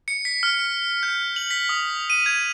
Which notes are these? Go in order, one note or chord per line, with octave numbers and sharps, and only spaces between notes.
C#7
B6
F6
G6
F#7
B6
D#6
D#7
G#6